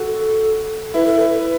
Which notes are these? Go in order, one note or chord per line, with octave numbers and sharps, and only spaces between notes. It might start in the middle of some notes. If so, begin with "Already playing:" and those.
Already playing: F#4 A4
E4 B4
A4
B4